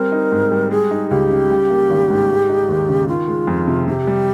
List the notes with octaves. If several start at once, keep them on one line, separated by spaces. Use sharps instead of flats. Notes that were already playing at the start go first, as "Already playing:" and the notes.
Already playing: G3 C4 A#4
D#4
G#2
G3
G#3 G#4
D#4
C#2 G4
C#3
G3
A#3
G#1
G#2
G#3
D#4
D#2
C#3
D#3 F4
G#3
F2
C3
C3 G4
G3